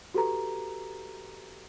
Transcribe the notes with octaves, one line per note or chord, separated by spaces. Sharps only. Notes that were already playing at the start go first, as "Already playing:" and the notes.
F#4 G4 A4 B4 A#5